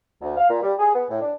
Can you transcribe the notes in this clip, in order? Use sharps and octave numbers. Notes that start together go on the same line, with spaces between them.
D2
F5
A#2
G3
G#4
B3
A2
D4